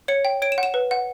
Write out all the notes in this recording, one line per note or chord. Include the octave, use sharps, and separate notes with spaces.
C#5 C#7
G5
C#5 D7
E7
F#5
E7
B4
F#5